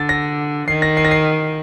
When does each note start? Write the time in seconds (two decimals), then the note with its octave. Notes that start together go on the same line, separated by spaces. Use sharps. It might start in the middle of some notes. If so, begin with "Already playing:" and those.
Already playing: D3 A6
0.09 A#6
0.68 D#3 C7
0.82 A#6
0.97 C7
1.05 A#6
1.11 C7